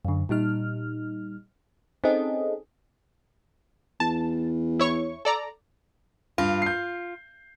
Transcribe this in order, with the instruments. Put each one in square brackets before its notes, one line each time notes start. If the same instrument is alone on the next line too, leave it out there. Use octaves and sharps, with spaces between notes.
[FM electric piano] F#2 D3
A#2 G3 D#4 F6
C4 C#4 D#4 G#4 A4 D#5
[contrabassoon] E2 [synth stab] A5
[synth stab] E4 C#5 C#6
A4 D5 A#5
[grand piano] G2 [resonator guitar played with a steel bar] F4
[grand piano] G6 C7